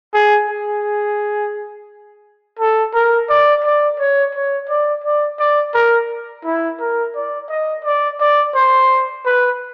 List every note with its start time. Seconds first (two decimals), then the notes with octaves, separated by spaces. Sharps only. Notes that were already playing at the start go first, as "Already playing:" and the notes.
0.14 G#4
0.49 G#4
2.59 A4
2.94 A#4
3.29 D5
3.64 D5
3.99 C#5
4.34 C#5
4.69 D5
5.04 D5
5.39 D5
5.74 A#4
6.45 E4
6.80 A#4
7.15 D5
7.49 D#5
7.84 D5
8.20 D5
8.55 C5
9.25 B4